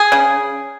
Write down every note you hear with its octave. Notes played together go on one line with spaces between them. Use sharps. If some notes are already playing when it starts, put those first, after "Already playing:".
Already playing: G#4
C#3